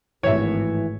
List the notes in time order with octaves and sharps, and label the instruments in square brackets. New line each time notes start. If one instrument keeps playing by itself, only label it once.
[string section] G#1 A2 [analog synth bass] E3 [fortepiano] C#5 E5